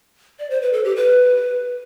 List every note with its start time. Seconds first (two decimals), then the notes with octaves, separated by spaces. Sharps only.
0.39 D5
0.50 C5
0.62 B4
0.73 A4
0.84 G4
0.96 B4